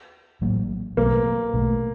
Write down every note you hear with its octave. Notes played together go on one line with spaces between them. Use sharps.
A1 A2 F#3 A#3
B1 B2 F#3 A3 A#3
B1 B2 F#3 A3